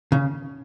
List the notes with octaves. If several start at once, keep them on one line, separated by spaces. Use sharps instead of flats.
C#3